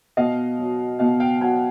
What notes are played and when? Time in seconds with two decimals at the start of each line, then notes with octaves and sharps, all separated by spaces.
0.17 B2 D#5 F5
0.58 F#3
0.99 B2 D#5 F5
1.20 F5 G5
1.41 F#3 F#5 G#5